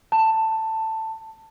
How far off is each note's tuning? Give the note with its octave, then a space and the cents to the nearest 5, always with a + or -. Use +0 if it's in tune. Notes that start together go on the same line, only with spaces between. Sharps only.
A5 +10